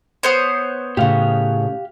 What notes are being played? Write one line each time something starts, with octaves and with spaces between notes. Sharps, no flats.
B3 C5 C#5
A2 C#3 G4 F5